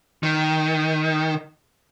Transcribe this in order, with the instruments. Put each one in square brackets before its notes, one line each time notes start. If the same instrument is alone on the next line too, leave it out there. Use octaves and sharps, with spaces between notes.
[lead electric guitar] D#3